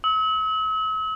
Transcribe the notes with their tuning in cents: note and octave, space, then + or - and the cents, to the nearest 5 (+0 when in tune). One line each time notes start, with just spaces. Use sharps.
E6 -45